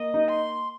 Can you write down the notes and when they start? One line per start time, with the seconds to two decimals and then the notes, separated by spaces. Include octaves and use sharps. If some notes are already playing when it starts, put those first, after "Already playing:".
Already playing: A#3 D#5
0.14 D#4
0.28 C6